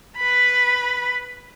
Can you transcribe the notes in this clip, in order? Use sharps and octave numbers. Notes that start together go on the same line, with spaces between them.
B4 B5